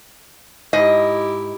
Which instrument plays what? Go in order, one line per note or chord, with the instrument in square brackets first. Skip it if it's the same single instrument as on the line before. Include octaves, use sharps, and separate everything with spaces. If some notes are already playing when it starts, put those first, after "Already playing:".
[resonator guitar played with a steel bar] G#2 D#5 [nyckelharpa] E4 G4